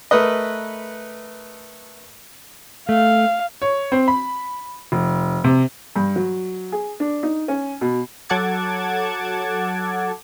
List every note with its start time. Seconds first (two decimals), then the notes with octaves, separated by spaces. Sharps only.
0.11 A3 A#4 B4 D#5
2.89 A3 F5
3.62 C#5
3.92 C4
4.08 B5
4.92 F1
5.44 C3
5.96 G2
6.16 F#3
6.72 G#4
7.00 D4
7.23 D#4
7.48 C#4
7.81 B2
8.29 F#3 A4 F#5 A5 D6 G#6